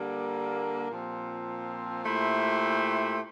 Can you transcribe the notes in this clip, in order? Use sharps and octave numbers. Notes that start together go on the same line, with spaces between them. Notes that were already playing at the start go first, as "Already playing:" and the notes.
Already playing: D3 G3 A#3
A#2 F3 C4
A#2 A3 E4 G4 C5